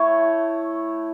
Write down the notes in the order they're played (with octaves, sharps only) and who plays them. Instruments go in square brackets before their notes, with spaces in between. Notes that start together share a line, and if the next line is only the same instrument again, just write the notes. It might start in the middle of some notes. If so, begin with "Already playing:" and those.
Already playing: [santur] A3 E4 C#5